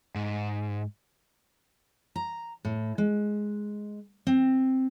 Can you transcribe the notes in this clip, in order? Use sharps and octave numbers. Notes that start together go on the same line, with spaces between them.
G#2
A#5
A2
G#3
C4